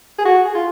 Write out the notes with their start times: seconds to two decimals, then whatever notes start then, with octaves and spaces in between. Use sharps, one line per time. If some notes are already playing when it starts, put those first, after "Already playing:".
0.19 G#4
0.25 F#4
0.45 G#4
0.55 F4